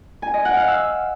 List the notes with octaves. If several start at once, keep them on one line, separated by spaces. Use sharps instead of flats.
G#5
D#5
F#5
F5
E6